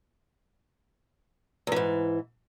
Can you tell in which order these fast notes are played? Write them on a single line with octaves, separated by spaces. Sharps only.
E2 E3 G#2